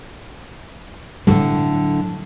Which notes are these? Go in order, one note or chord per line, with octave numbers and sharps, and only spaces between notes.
A2 D3 F#3 C4